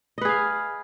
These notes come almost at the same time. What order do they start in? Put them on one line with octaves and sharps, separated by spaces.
D#5 B4 G#4 F5